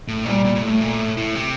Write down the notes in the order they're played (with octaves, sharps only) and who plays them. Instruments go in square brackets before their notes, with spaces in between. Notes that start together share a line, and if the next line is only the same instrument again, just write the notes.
[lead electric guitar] A2
[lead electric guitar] A#2 [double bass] G3
[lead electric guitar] A#2
A#2
[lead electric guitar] A2 [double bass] A3
[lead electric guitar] A#2
A2
A2
C3